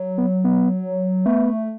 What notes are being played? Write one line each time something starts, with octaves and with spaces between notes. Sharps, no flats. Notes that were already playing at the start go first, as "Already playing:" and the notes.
Already playing: F#3
B3
B3
A3 B3